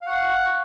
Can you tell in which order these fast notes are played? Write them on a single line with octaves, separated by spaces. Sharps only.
F5 F#5 C#6